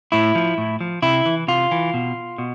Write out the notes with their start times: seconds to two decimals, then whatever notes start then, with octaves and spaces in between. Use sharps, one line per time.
0.12 A2 E4
0.35 F3
0.58 A2
0.81 F3
1.02 C3 E4
1.26 E3
1.48 C3 F4
1.71 E3
1.94 B2
2.38 B2